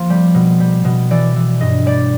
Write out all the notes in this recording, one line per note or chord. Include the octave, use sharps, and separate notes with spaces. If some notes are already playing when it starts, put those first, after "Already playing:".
Already playing: F3 A#3
G3
B2
G3
B2
E3 D5
E3
G2 D#5
G3 D5